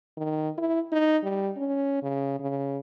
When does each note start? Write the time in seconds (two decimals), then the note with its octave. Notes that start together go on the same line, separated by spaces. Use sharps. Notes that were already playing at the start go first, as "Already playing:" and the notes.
0.17 D#3
0.58 E4
0.92 D#4
1.23 G3
1.57 C#4
2.03 C#3
2.40 C#3